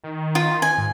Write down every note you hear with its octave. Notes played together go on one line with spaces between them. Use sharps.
D#3
F4
G#5
G#2